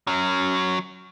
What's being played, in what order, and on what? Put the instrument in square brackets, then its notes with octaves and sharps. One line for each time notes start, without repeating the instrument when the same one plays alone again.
[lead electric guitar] F#3 C#4